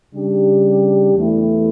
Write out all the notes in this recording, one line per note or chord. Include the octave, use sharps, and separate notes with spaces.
C#3 G3 D4 G4
E2 E3 A3 E4